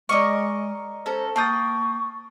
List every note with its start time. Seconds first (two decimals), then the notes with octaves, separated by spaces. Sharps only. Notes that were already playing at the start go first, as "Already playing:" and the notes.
0.09 G#3 A#4 D5 D#5 C#6 D6 F6
1.06 C#4 A4 C5 A#5
1.36 A#3 G5 A5 C#6 D#6 G6 A6